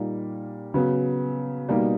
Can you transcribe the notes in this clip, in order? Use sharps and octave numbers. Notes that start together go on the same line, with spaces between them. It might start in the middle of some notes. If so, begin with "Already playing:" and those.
Already playing: A#2 G3 A#3 D#4
C#3 F#3 B3
B2 G3 A#3 D#4